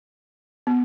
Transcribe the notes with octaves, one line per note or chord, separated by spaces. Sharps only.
B3